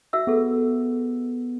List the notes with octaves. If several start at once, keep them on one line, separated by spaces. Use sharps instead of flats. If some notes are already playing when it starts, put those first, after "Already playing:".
F#4 E5 E6
B3 G#4 A4